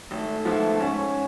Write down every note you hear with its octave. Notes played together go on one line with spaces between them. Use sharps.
G#1 A3
G#2 F3 B3
G#2 C#4